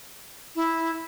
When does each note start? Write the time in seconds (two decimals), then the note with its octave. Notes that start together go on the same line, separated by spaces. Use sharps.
0.56 E4